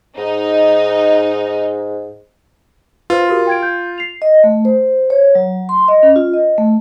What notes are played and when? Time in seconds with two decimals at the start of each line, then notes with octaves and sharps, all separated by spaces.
0.18 G#2 D#4
3.10 F4 B4 C5
3.28 F#4 G4 A#4
3.47 G5 G#6 D7
3.63 G6
3.98 C7 F7
4.22 D#5
4.44 A3
4.65 C5
5.10 C#5
5.35 F#3
5.69 C6
5.88 D#5
6.03 C#4
6.16 F4
6.34 D#5
6.58 A3